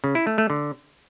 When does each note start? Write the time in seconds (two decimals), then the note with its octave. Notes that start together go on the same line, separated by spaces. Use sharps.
0.04 C#3
0.15 E4
0.27 A3
0.38 A3
0.50 D3